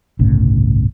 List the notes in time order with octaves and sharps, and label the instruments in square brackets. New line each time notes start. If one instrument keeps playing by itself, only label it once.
[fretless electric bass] G1 C2 A2 C#3